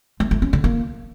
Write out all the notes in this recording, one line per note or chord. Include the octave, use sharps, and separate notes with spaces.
A3
A3
C#4
D3
A#3